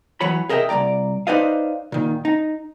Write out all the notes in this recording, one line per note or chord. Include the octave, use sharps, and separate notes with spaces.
E3 F#3 C#5 B5
G#4 A#4 D#5 E5 G5
C2 F#3 D5 A#5
D#4 B4 C5 D5 D#5 F5
A#2 D#3
D#4